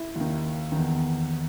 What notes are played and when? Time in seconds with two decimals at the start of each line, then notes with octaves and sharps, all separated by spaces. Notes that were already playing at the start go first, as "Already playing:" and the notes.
Already playing: E4
0.16 D#2
0.21 D#3
0.72 E2 D#3